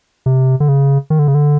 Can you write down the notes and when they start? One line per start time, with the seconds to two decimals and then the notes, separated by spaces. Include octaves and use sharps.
0.26 C3
0.60 D3
0.69 C#3
1.10 D#3
1.19 D3
1.27 C#3
1.35 D3